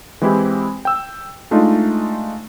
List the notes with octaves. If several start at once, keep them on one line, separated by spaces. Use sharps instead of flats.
E3 G#3 C4 E4 G4
G5 E6
G#3 A3 D4 D#4 F4